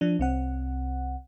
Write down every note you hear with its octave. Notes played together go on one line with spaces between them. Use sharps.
F3 D4
C2 C4 F#5